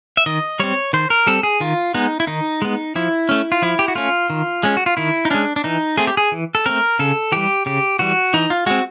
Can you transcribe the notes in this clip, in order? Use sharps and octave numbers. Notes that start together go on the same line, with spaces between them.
E5
D#3 D#5
G3 C4 C#5
D#3 C5
A#4
G3 C4 A4
G#4
D#3 F4
G#3 B3 D#4
E4
D#3 D#4
G#3 B3
F3 E4
A3 C#4
F4
F3 E4
G4
F#4
A3 C#4 F4
D#3
G#3 C#4
F#4
F4
D#3 E4
D#4
G#3 C#4 D4
D4
E3 D#4
A3 C4 G#4
G4
G#4
E3
A4
A3 C4 A#4
C#3 A4
E3 G3 G4
C#3 G4
E3 G3 F#4
E3 D#4
F4
G#3 C4 F#4